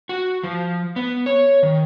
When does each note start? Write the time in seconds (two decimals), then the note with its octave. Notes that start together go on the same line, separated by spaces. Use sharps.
0.09 F#4
0.43 F3
0.96 B3
1.26 C#5
1.63 D#3